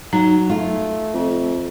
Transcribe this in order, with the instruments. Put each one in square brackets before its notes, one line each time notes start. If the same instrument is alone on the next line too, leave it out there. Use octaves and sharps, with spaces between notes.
[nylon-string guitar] F#3 [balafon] D#4 A#5
[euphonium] A3 [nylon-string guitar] F4
[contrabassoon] F2